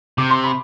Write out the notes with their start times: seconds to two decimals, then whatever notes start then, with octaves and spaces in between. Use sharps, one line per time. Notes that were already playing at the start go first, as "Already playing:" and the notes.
0.18 C3 D6
0.31 C6
0.44 B5